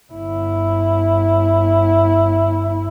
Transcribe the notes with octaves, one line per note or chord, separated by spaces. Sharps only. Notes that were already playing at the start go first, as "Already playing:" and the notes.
G1 E4